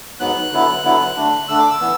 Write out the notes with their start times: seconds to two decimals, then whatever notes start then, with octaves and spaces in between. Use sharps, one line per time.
0.20 G#2 F#3 B3 F#6
0.52 D3 F#3 B3 E4
0.84 D3 F#3 B3 E4
1.16 D3 A3 D4
1.48 D3 A3 D4 E6
1.59 D6
1.70 E6
1.80 E3 B3